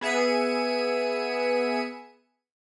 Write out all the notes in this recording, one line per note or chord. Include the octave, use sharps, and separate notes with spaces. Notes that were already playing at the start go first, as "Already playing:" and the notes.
B3 G#4 E5 C#7 D#7